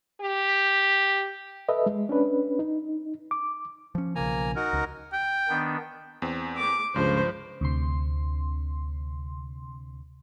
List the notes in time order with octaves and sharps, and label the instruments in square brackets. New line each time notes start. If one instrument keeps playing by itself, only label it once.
[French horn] G4
[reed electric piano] A4 B4 D#5 E5
G#3
C#4 D4 B4
D#4
D6
[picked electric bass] F3 C#4
[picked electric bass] B1 C#3 F3 [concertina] A#3 G#5 A#5
[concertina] D#4 F#4 A#4
[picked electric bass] C#2
[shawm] G5
[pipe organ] D#3 B3 D4
[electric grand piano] E2 C4
[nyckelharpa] D6
[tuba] C#2 [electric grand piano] G2 F3 [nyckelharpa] C5
[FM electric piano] D2 C3 C6